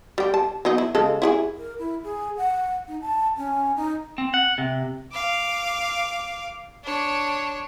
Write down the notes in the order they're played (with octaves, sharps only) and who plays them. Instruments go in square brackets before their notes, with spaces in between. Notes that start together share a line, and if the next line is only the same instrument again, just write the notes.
[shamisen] G3 G5
A5
F#3 B3 D#4
E4
C#3 G#3 A4
E4 F#4 G#4
[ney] A#4
E4
G#4
F#5
D#4
A5
C#4
D#4
[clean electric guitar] C4
F#5
C3
[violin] F5 D6
D4 C#5